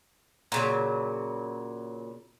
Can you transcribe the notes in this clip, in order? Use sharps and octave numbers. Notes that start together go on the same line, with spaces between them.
A#2 C#3 F#3